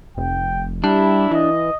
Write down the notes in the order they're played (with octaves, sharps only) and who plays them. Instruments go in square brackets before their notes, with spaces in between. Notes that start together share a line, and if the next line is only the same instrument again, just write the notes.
[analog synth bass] F1 [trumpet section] G5
[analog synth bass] G3 [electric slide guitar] D4 [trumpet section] E4
[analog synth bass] E3 [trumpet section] D#5